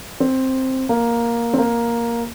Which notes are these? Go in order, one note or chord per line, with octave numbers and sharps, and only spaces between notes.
C4
A#3
C4
A#3